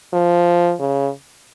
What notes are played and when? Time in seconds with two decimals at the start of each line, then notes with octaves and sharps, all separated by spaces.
0.14 F3
0.80 C#3